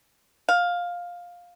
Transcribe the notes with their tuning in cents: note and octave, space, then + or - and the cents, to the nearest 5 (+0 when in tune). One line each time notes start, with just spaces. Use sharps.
F5 +10